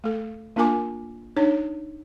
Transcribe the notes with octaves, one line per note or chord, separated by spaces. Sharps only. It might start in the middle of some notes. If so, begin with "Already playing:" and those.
A3 A4
A#3 D4 F4 A#4 G#5 D6
D4 D#4 C#5